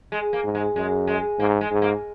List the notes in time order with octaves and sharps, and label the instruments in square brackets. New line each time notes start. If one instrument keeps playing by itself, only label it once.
[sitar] G#3
A#3
[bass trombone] G#2
[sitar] G#3
[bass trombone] F#2 [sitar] G#3
[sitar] G#3
[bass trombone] G#2 [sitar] A#3
[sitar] G#3
[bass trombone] G#2
[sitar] A#3